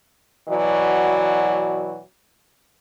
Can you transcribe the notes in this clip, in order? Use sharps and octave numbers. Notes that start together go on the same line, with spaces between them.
B2 E3 F#3 F#4 D5